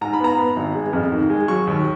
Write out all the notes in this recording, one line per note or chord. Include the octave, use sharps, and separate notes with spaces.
G#2 A#5
B5
B3 A#5
B3
G#1
G#3
F2
D#3
G#3
F#3 C#6
D#2